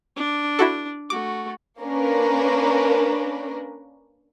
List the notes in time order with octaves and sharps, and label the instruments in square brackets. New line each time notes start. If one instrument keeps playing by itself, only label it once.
[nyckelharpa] D4
[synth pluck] E4 F#4 A4
[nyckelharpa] A3 F#4 [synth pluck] D6
[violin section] A#3 C#4 D4 A#4 B4